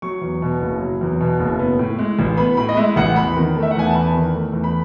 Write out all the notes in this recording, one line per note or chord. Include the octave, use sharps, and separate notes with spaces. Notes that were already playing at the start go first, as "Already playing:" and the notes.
F#3 C#6
E2
B2
F#1
F#3
E2
B2
F#1
B3
A2
G#3
A1
B3 B5
A2 B5
D#5
G#3 E5
A1 F#5
E2 B5
D#3
A3
E5
F#5
E2 G#5
A5
E2 B5
D#3
A3
E2
B5